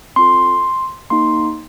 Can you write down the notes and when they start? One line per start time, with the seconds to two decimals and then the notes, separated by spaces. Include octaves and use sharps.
0.16 C4 F4 A4 C6
1.10 A#3 D#4 G4 C6